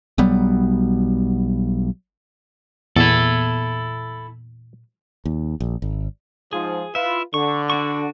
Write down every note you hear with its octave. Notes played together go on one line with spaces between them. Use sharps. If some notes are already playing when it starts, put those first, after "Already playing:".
B1 F#3 G3 B3
E2 A#2 B3 E4 A4
D#2
A#1
G#1
G#2 F3 G#4
E4 F4 B4 E5
D3 C#6
D4 F#4 C#6